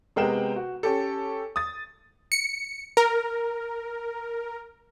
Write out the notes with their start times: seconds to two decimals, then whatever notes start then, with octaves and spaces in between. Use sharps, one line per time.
0.16 C3 G#3 B3 A#4 G5 E7
0.56 F#4
0.83 C#4 G4 A4
1.56 D#6 A6
2.32 C#7
2.97 A#4